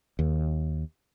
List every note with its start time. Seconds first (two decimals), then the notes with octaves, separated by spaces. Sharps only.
0.19 D#2